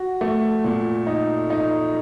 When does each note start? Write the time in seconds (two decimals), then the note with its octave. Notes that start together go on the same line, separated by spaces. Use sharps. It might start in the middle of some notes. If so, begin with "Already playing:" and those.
Already playing: F#4
0.21 A3
0.64 A#2
1.07 D#4
1.50 D#4